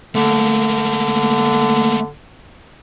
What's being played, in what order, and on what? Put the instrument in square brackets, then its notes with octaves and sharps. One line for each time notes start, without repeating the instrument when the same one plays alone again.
[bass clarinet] D3 [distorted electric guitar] A3 A#3